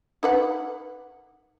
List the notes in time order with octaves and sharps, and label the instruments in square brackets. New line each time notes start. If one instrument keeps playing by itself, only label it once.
[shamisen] D#4 B4 F#5